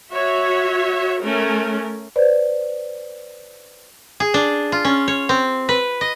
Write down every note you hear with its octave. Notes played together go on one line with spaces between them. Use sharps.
F#4 C#5 E5
A3 C#4 A#4
B4 C5 D5
G#4
D4
F4
C#4
C#5
C4
B4
D#5